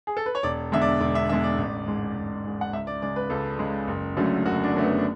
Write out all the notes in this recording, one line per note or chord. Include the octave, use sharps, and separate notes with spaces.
G#4
A4
B4
C#5
E1 D5
E2 D3 G#3 E5
D5
E1 D5
E5
E2 D3 G#3 E5
D5
A1
G#2 G#3
A1
G#2 G#3
F#5
C#2 E5
D5
C#3 G#3 D5
B4
C#2 A4
C#3 G#3
F#1
F#2 D3 F#3 A3
F#1 F#4
D4
F#2 D3 F#3 A3
B3
D4